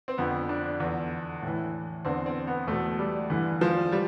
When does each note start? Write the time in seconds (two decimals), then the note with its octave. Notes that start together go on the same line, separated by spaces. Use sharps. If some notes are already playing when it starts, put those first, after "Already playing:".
0.08 C4
0.18 F2 D3 B3
0.49 D4
0.80 E2 D3
1.42 A2 E3
2.05 E2 D3 C4
2.26 C4
2.47 B3
2.67 E2 B2 A3
2.99 G3
3.30 G2 D3 E3
3.61 F3
3.92 G3